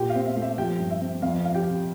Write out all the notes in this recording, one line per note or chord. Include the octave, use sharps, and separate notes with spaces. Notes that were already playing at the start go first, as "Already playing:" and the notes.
Already playing: A#2 G4 G5
F5
C4
E5
A3
E5
F3 G4 G5
G2
E5
C4
F2 F5
F3 F5
G4 G5
C3